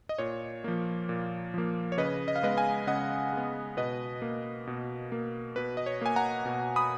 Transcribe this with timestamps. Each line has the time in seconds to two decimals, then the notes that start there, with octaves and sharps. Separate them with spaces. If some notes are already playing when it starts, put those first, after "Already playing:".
0.09 D#5
0.18 A#2 C#5
0.64 F3 A#3
1.09 A#2
1.54 F3 A#3
1.92 C#5
1.97 C#3 B4 D#5
2.28 D#5
2.36 F5
2.43 G#3 B3 B4 D#5
2.57 F5 G#5
2.87 C#3 D#5 F#5
3.33 G#3 B3
3.77 B2 B4 D#5
4.22 A#3
4.67 B2
5.12 A#3
5.56 B2 B4
5.77 D#5
5.86 C#5
6.01 A#3 G#5
6.16 F#5 A#5
6.45 B2
6.76 B5 D#6